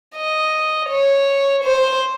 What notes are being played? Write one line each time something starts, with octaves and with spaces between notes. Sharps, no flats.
D#5
C#5
C5